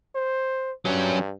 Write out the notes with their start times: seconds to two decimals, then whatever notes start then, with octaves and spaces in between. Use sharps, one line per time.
0.15 C5
0.85 G2 F#3 C#4